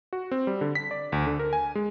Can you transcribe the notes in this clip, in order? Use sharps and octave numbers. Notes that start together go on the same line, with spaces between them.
F#4
C4
G3
D3
B6
D5
D2
D3
A#4
G#5
G#3